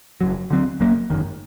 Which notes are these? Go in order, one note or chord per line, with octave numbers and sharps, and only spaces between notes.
F#1 F#2 F#3
D2 D3 F#3 C4
F#1 F#2 F#3 A#3
G1 F#2 D#3